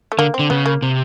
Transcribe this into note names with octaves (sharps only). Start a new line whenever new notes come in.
A3
D3 A#3
C4
D3
C#3 B3
A#3
C3